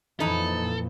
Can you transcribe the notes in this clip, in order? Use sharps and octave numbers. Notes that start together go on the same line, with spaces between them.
F2 A#2 E3 D#4 E4 A4